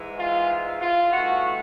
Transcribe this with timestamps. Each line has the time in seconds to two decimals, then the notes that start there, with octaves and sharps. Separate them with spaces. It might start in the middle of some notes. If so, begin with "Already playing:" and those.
Already playing: G#2 E3 G#3
0.19 F4
0.81 F4
1.12 G2 E3 A3 F#4